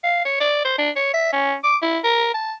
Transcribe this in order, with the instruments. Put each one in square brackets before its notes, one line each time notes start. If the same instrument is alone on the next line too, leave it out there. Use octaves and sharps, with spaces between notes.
[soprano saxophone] F5
C#5
D5
C5
D4
C#5
E5
C#4
D6
E4
A#4
A5